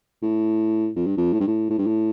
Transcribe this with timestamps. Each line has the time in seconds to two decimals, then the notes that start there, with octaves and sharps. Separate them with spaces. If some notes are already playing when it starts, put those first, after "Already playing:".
0.22 A2
0.96 F2
1.06 G2
1.17 F2
1.33 A2
1.40 G2
1.47 A2
1.70 A2
1.78 G2
1.86 A2